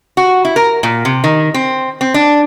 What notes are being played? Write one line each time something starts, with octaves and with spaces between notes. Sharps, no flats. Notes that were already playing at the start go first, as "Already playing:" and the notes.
F#4
E4
A#4
A#2
C3
D#3
C4
C4
D4